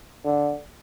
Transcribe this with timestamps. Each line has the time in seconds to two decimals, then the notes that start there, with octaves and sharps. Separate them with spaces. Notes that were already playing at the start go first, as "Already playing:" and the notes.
0.24 D3